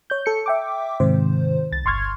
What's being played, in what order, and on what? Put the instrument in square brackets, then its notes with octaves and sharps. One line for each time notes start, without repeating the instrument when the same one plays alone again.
[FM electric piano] C#5 G6
A4 C#7
E5 G5 D6
G#2 C3 D#3 C5
C2 A6
G1 C6 C#6 F6 G#6